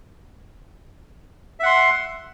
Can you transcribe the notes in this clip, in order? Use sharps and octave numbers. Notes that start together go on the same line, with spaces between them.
E5 F#5 C6